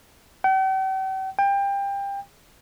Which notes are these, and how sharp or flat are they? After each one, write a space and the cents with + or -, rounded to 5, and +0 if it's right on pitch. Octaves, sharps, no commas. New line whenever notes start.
G5 -45
G5 +25